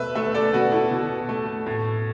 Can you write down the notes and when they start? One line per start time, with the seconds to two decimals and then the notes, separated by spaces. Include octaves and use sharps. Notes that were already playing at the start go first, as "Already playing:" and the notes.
Already playing: B2 A3 B4 E5
0.15 A3 B4 E5
0.34 A4 D5
0.53 B2 F#4 B4
0.72 E4 A4
0.91 B2
1.29 A3
1.66 A2